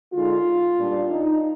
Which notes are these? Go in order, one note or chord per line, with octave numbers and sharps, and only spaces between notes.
D3 G#3 D#4 F4
A#2 G3 D4
D#4